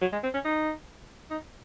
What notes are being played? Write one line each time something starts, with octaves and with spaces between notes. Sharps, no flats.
F#3
G#3
C4
C#4
D#4
D#4